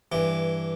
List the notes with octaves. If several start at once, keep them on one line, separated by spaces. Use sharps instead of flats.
G2 E3 G4